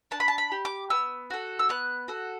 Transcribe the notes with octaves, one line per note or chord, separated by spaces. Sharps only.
D4 A5
B5
A5
B5
G4
D6
B3 E6
F#4 A4
E6
B3 F#6
F#4 A4